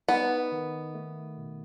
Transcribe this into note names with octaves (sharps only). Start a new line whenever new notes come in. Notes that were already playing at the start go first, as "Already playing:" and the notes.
B3 D#4
D#3
A3
B2